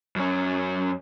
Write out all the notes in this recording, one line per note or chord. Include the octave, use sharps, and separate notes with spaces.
F#2 C#4